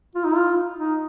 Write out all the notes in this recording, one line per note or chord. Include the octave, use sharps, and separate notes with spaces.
F4
D#4
F4
D#4